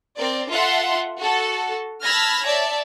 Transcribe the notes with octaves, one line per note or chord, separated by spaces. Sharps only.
C4 A#4 D5
F4 A4 E5 F#5 C6
F#4 A4
A5 B5 E6 F6 G#6 A#6
C#5 D5 E5 A5